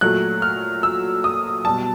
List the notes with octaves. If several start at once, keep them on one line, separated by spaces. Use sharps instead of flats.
A#2 F#3 A3 F#6
F6
E6
D#6
B2 G3 A5